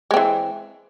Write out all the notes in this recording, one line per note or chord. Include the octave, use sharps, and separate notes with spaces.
E3 G#3 C4